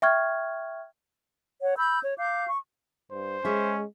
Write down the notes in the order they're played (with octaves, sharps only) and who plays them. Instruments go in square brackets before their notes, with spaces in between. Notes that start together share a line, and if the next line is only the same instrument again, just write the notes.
[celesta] E5 G5 C#6 F6 G#6
[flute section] C#5 F#5
B5 E6 G6
C#5
F5 D6 G6
C#6
[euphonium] G2 [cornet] C5
[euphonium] G#3 [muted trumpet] C#4 [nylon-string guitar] G#4 E5